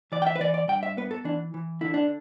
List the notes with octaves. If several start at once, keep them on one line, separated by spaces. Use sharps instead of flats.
E3 D5
G5
E5
B4
E3 D5
D5
G2 G5
E5
B3 B4
A4
E3 D4
E3
D3 E4
D4